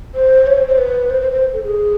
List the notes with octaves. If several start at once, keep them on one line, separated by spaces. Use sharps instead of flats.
C5
C#5
C5
C5
B4
C5
C5
C5
A4
G#4